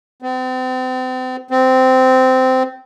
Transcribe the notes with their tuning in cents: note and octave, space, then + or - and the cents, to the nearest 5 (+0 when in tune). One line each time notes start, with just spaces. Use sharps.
C4 -40
C4 -15